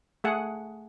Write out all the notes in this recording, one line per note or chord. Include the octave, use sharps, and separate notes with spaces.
A3 G#4 F#5